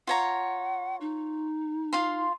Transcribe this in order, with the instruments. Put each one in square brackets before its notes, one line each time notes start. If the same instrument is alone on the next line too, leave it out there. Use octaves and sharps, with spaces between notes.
[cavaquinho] F4 C#5 A#5 [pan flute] F#5
[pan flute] D#4
[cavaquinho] F4 F5 C6